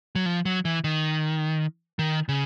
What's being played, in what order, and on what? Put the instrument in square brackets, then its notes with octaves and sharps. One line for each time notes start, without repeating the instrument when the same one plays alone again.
[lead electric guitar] F#3
F3
F#3
E3
D#3
D#3
C#3